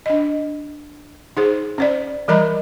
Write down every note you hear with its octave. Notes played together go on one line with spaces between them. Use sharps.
D4 D#5
D#4 G#4 C5
C#4 C5 D5
E3 G3 A#4 D#5 A#5 B5